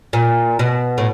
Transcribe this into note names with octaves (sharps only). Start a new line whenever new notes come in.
A#2
B2
A2